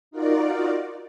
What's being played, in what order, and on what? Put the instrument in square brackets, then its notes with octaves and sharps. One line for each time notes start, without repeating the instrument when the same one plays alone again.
[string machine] D#4 F4 F#4 A#4 D5